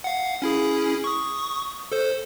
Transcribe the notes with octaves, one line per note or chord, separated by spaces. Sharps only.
F5 F#5
C#4 E4 G#4
C#6 D#6
A4 C5